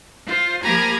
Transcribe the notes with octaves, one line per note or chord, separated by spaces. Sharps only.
F4 C5
F3 A#3 G4 G#5 A#5 B5